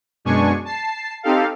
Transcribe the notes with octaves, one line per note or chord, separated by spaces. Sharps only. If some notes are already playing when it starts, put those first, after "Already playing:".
F#2 B2 G#3 D4 G#5 C#6
A5 C7
C4 D#4 G4 A4 F5